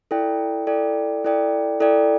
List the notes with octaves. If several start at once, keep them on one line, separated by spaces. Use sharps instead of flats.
E4 A4 D5 G5
E4 A4 D5 G5
E4 A4 D5 G5
E4 A4 D5 G5